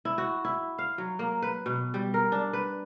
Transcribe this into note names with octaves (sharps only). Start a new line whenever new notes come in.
E4
F#4
E4
F5
F#3
A#3
B4
B2
G3
A#4
D4
B4